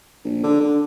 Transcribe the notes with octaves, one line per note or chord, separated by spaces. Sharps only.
A#1
D3
D3